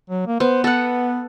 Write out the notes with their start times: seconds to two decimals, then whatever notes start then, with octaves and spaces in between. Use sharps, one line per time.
0.10 F#3
0.27 A#3
0.40 B3 C5
0.64 B3 A4 F#5